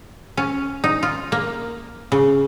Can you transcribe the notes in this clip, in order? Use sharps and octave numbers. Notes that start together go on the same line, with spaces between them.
C#4
D#4
F4
A#3
C#3